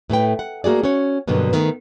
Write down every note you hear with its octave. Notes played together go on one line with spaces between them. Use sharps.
A2 A3 B4 G5
F#5
A3 A#3 F#4 G#4 D5
C#4 F#4 C#5
G2 B2 D3 F#3 A#3 B3
D#3 A3 B3